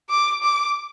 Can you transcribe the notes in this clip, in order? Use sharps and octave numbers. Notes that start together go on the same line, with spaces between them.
D6
D6